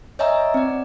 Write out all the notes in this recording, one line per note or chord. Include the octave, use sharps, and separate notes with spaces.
C#5 D#5 E5 G#5 A#5 E6
C4 D5